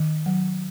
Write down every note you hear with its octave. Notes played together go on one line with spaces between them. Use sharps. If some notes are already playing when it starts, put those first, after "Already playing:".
Already playing: D#3
F#3